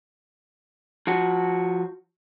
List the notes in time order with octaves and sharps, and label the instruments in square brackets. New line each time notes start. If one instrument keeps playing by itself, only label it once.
[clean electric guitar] F3 F#4